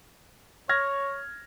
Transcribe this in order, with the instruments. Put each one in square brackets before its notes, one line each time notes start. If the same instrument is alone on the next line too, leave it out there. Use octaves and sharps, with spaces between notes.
[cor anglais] C#5 [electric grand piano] F6 G#6 A#6